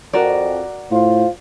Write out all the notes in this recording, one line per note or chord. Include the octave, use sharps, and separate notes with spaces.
F2 F#4 A#4 D5
A2 F4 C5